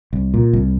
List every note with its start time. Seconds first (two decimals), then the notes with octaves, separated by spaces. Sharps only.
0.13 C2
0.34 A#2
0.53 C2